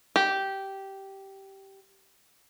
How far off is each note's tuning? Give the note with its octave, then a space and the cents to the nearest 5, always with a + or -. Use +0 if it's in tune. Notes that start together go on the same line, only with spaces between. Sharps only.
G4 -10